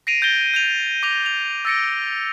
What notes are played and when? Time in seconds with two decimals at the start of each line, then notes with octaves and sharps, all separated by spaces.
0.07 A#6 C7 D7 D#7 F7
0.22 G6 A6 A#6 D7 G7
0.54 G6 D#7 F7
1.03 D6 A#6 F7
1.26 F7
1.65 E6 A6 A#6 C#7 D7